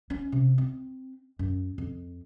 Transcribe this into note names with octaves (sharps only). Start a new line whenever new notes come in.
C#4
C3
C4
F#2
F2